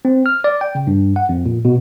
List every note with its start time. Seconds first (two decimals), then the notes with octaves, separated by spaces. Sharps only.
0.05 C4
0.26 F6
0.44 D5
0.61 G5
0.75 C#3
0.87 G2
1.16 F#5
1.29 F2
1.46 A#2
1.65 B2